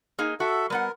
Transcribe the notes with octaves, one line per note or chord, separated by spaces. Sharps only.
A#3 D#4 G#4
F#4 A4 E5
G3 B3 A#4 F#5